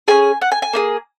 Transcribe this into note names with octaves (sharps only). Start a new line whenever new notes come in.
C#4 G#4 G#5
F#5
G#5
G#5
A#3 D#4 G#4